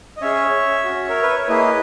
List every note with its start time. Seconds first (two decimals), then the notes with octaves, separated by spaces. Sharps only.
0.16 D#5
0.21 C#4 G#4 C#5 E5
0.84 C#4 F#4
1.09 A#4
1.22 B4
1.35 C#5
1.48 A#3 E4 G#4 B4 D#5